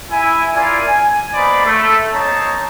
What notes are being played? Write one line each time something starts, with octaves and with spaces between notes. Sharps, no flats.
E4 G#5
E4 F4 A#4 D5 G#5
G#5
A#3 B3 D#4 C5 D5 B5
A3
A#3 C4 D#4 C#5 A5 A#5